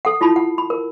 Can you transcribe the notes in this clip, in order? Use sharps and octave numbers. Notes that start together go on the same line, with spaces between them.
A4 F#5
E4 F4 A5 B5
F#5
B5
A#4